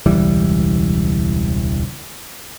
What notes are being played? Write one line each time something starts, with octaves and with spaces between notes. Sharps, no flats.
E1 C#2 E3 G3